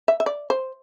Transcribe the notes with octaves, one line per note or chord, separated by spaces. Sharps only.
E5
E5
D5
C5